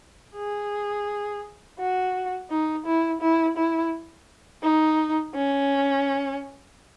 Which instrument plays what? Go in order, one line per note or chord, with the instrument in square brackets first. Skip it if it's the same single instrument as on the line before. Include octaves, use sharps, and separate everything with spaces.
[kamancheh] G#4
F#4
D#4
E4
E4
E4
D#4
C#4